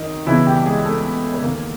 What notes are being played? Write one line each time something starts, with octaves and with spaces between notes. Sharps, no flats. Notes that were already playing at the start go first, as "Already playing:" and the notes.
Already playing: F#2 D#3 D#4
C#2 B2 E3 E4
G3 G4
G#3 G#4
A3 A4
B4
D#2 D#3 A#3 A#4